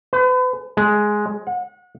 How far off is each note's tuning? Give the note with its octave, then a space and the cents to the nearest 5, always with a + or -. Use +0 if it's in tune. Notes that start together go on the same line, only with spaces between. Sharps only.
B4 +40
G#3 +5
F#5 -35